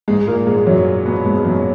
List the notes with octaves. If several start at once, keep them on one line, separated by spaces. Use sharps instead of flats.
G#2 G#3
A#2 A#3
G#2 G#3
F#2 F#3
B2 B3
G#2 G#3
F#2 F#3